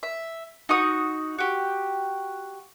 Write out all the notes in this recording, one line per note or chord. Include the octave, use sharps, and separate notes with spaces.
E5
D#4 F#4 D#6
F#4 G4